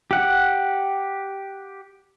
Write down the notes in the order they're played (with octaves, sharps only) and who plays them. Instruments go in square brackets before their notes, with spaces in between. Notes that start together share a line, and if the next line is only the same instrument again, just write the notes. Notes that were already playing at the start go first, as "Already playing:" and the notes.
[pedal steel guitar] G4 F#5